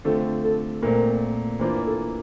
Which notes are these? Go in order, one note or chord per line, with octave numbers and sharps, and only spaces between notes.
D3 A3 C4 F4 A4
A4
A#2 A3 C4 A#4
E3 A#3 D4 F4 C5
A4